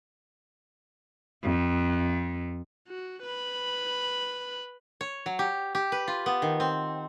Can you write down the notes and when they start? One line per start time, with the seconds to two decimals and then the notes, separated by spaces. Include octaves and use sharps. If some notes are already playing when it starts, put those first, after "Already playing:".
1.43 F2
2.88 F#4
3.23 B4 B5
5.01 C#5
5.26 F#3
5.39 G4
5.75 G4
5.92 B4
6.07 F4
6.26 B3
6.42 D#3
6.60 C4